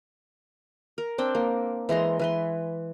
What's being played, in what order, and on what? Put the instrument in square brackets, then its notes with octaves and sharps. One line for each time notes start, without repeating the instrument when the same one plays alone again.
[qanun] A#4
C4 D4 G5
A#3
E3 G#3 A#5 C6
E3 B4 C6